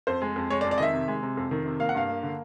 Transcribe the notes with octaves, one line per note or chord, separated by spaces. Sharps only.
F2 C5
G#3
F2
G#3 C#5
D5
F2
D5
D#3 D#5 E5
C3
G#3
C3
F2
D#3
C3
A#3 F5
F#5
G2 F5
A#3
D3